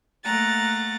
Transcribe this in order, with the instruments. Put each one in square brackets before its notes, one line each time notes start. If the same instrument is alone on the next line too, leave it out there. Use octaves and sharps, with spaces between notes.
[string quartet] A3 A#3 F#5 A#5 A6